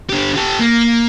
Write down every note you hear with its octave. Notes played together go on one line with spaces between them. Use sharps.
D3 G4
G4 A4
A#3